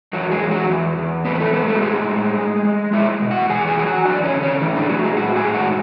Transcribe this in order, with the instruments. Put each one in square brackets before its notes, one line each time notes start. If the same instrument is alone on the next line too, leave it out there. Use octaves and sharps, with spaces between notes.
[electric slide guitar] E2 F#3 F#4
G#3 G#4
E2
F#3 F#4
E2
E2
A2 B3 B4
B4
A3 A4
G#3 B3 B4
A3 A4
F#4
A2 G#3 G#4
A2
G#3
G#3
G#3 E4 E5
B2
F#4 F#5
E2 G#4 G#5
G#4 G#5
F#3 G#5
F#4 F#5
E2 D4 D5
C#4 C#5
D3
C#4 C#5
A2 E3 E4
D3 D4
A2 F#3 F#4
G#3 G#4
A2 F#4 F#5
G#4 G#5
G#3
F#4 F#5